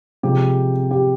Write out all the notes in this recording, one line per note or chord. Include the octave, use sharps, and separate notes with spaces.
C3 F3 G#3 G4
G4